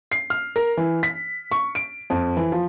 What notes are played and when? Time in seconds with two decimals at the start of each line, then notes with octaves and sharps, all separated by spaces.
0.12 C7
0.30 F6
0.56 A#4
0.77 E3
1.03 B6
1.52 C#6
1.75 D7
2.10 F2
2.37 E3
2.52 F3